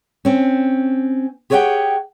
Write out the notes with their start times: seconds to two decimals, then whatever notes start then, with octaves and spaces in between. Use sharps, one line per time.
0.25 C4 C#4
1.50 G4 G#4 C#5 D5 F#5 G5